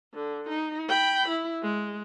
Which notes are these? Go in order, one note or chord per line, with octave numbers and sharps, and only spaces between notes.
D3
D#4
G5 B5
E4
G#3